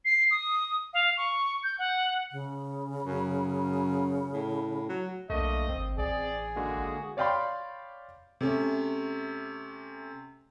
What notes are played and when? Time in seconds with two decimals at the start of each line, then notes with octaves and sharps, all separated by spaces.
0.05 C7
0.31 D#6
0.94 F5
1.17 C#6
1.64 G6
1.79 F#5
2.32 C#3
3.06 F#2
4.33 A2
4.89 F#3
5.30 B1 A3 A#3 D4 D#5
5.69 G#1 C4
5.98 A1 G#4 D5
6.56 D3 G#3 A#3 F#4
7.17 C#5 D5 F5 G5 B5 C6
8.41 C3 A3 C#4